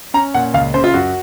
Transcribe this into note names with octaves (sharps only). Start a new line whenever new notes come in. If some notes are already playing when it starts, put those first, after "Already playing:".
C#4 A#5
A#2 F#5
C#2 F5
C#3 C5
F4
F#2 F#4